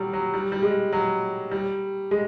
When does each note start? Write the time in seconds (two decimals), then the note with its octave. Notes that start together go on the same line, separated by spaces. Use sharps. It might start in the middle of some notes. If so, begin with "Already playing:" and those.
Already playing: F#3 G3
0.13 F#3
0.34 G3
0.52 G3
0.63 G#3
0.93 F#3
1.52 G3
2.11 G#3